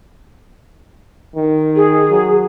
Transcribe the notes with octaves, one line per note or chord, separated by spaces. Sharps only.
D#3
G#4
F#3